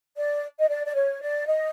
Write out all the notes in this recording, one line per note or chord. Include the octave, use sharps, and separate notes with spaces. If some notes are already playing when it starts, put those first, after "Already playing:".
D5
D#5
D5
D5
C#5
D5
D#5